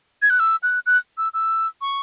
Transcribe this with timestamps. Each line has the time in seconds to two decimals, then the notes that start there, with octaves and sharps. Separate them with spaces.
0.22 G#6
0.30 F#6
0.39 E6
0.63 F#6
0.86 F#6
1.17 E6
1.34 E6
1.81 C#6